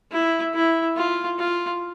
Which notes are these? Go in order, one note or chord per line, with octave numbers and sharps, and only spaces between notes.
E4
E4
F4
F4